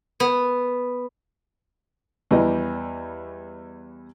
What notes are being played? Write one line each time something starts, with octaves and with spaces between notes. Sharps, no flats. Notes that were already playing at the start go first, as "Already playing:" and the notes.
B3
E2 E3 G3 D#5